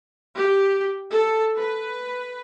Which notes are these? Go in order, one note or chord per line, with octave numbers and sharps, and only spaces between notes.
G4
A4
B4